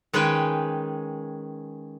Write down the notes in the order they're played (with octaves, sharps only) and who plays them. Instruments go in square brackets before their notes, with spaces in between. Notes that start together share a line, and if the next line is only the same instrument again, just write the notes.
[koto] D#3 G#3 C#4 B4 G5 G#5